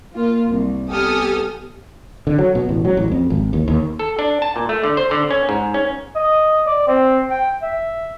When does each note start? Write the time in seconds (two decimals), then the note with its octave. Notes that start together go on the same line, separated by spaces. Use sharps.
0.14 A#3 F4
0.48 C2
0.89 B3 G4 A4 G#5 D#6 F6
2.27 D3
2.39 F#3
2.55 B2
2.69 A1
2.85 F#3
2.97 A1
3.11 F2
3.30 G#1
3.53 D#2
3.68 D#2
3.99 A4
4.19 D4
4.42 A5
4.56 A#2
4.69 A3
4.84 D3
4.97 C5
5.11 D3
5.31 C#4
5.49 G#2
5.74 C#4
6.15 D#5
6.66 D5
6.87 C4
7.30 G5
7.62 E5